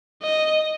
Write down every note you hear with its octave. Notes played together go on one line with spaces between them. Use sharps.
D#5